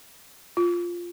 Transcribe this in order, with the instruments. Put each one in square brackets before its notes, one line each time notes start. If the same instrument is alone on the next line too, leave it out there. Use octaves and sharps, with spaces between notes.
[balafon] F4